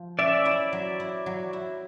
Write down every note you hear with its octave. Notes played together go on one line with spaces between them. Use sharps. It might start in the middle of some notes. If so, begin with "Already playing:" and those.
Already playing: F3
C#4 D5 E5
E4
F#3
E4
F#3
E4